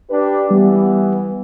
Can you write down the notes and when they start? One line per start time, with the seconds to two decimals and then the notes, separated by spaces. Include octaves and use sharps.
0.11 D4 G4 B4
0.51 E3 G3 B3